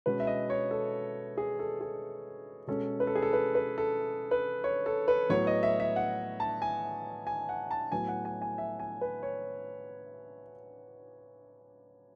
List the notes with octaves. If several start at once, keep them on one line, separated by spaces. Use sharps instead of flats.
B2 G#3 C#4 B4
E5
D#5
C#5
A4
G#4
A4
G#4
B2 G#3 C#4 A4
B4
A4
G#4
A4
B4
B4
A4
B4
C#5
A4
B4
A2 F#3 B3 C#5
D#5
E5
E5
F#5
A5
G#5
G#5
F#5
A5
A2 F#3 B3 G#5
F#5
G#5
G#5
E5
G#5
B4
C#5